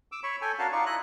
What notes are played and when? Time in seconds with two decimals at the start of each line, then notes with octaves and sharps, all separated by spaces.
0.12 D6 E6
0.23 C#5 B5 C#6
0.42 A4 G5 G#5
0.59 C#4 D4 F#4 A#4 F5 A5
0.72 D#4 F4 D5 C#6
0.86 E4 D#5 F#6